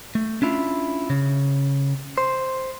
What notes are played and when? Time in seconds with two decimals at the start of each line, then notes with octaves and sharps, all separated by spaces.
0.15 A3
0.42 C#4 D4 E4 F4
1.10 C#3
2.18 C5